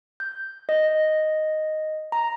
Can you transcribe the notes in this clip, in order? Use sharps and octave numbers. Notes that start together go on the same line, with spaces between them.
G6
D#5
A#5